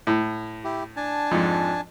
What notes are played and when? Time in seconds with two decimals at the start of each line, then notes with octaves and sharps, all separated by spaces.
0.07 A2
0.64 E4 G4
0.96 D4 G#5 A5
1.31 F2 G#2